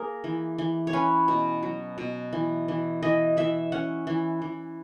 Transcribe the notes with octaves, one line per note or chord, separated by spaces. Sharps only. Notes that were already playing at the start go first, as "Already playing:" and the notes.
Already playing: A#3 G#4 A#4
E3
E3
C#5
C#4 B4
B2
F#3
B2
E3
E3
E3 D#5
E3 E5
C#4 F#5
E3
E3